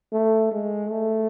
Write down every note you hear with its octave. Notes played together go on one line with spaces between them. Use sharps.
A3
G#3
A3